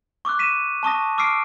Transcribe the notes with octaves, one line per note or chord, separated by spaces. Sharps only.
C#6 D6 E6 F#6
B6 D#7 E7
A5 C#6 D#6 A#6
D6 E6 F6 C7 D7